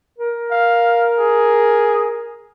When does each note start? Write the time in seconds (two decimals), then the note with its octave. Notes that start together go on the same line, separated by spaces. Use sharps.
0.19 A#4
0.51 F5
1.19 G#4